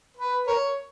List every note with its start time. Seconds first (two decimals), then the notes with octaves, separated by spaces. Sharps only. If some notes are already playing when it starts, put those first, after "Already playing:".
0.17 B4
0.47 A#4 C#5